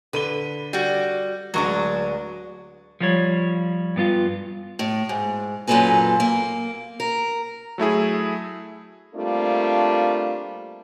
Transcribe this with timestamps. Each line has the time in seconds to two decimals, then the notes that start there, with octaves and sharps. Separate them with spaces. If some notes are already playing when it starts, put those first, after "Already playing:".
0.13 D3 B4 D#7 G7
0.73 G3 F#4
1.54 D1 F#3 G#3 D4 C#6
3.00 F3 G3 C#5
3.96 G2 B3 F4
4.79 A2
5.09 G#2
5.67 F#2 A#2 F4 A4 B4 G#5
6.20 A#3
7.00 A#4
7.78 F#3 A3 E4 G#4
9.15 G3 A3 A#3 C4 D4 F4